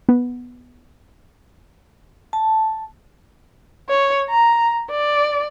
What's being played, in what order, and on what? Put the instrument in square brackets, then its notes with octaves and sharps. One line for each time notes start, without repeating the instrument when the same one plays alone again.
[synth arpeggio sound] B3
[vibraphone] A5
[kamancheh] C#5
A#5
D5